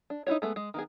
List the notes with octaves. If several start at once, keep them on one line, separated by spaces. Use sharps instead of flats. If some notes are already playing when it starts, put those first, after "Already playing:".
D4
D#4 E4 F#4 C#5
G#3 A3 B3
G#3
D#3 B3 G#4